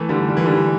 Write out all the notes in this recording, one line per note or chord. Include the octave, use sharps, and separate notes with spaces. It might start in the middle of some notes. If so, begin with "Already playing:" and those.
Already playing: E3 A3
D3 G3
G3
E3
D3 G3